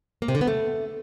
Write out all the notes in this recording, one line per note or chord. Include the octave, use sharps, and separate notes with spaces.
A#3
C3
D3
B3
A3